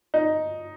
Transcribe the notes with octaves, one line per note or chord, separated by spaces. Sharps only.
D#4